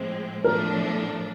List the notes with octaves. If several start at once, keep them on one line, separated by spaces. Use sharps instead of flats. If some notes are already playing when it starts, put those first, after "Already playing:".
Already playing: A2 F3 G#3 C4
A2 F3 A3 D4 A#4